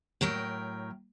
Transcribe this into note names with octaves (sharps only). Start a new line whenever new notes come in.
A2 F#3 A#4 G5